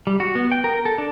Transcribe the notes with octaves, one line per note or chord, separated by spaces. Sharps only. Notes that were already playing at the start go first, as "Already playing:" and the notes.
G3
F#4
B3
G5
A#4
A4
D4